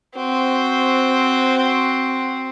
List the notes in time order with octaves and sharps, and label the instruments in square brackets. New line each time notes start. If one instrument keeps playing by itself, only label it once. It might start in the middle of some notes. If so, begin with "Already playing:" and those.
[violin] C4 [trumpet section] F#4 C5